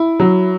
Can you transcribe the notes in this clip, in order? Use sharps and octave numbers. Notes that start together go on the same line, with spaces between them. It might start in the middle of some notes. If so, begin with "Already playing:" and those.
Already playing: E4
F#3